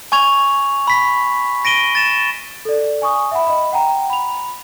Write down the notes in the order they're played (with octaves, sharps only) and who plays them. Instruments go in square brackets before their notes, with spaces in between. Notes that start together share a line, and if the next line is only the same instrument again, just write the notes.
[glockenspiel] G#5 C#6 G#6 F7
B5 B6
A#6 D7 D#7 G7
A6 E7
[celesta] A4 D5
G#5 C#6 D#6
E5 F#5 B5
D#5 B5
F#5 G5 A#5
B5 F7